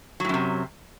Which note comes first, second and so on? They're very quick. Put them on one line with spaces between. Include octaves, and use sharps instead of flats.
F#3 A2 F#2 C3